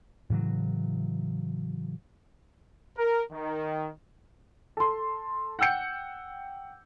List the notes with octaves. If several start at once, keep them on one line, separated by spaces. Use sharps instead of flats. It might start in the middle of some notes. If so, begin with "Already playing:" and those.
A2 C#3 E3 F#3
A#4
D#3
A4 C6
F#5 G5 E6 G6 C#7